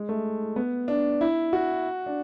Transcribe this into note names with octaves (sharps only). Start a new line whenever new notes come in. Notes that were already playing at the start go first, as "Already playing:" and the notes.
Already playing: G#3
A3
B3
D4
E4
F#4
D4